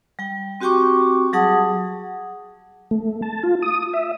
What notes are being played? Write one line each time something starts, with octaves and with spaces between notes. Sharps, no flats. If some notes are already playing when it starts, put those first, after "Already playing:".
G3 G5
C4 F#4 G4 G5 C#6 D6
F#3 G3 G#4 F#5 A5 D#6
A3
A5
F4
D#6
E5